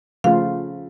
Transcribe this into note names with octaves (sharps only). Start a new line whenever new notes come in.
C#3 F3 A3 F4 F5